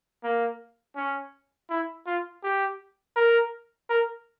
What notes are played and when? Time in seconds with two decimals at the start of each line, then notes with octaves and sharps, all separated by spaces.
0.24 A#3
0.96 C#4
1.70 E4
2.06 F4
2.43 G4
3.16 A#4
3.89 A#4